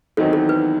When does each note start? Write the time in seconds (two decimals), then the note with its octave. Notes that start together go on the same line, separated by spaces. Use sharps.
0.17 E2 D#3 F#3 C4 D#4 A4
0.33 A4
0.49 B4